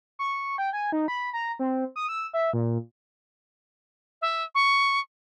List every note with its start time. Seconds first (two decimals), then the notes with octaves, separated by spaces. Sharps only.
0.19 C#6
0.58 G5
0.73 G#5
0.92 D#4
1.08 B5
1.33 A#5
1.59 C4
1.96 D#6
2.09 E6
2.34 E5
2.53 A#2
4.22 E5
4.55 C#6